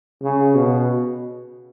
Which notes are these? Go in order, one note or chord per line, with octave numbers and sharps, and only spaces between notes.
C#3
B2